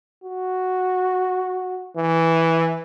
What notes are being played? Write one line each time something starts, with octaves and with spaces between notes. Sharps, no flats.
F#4
E3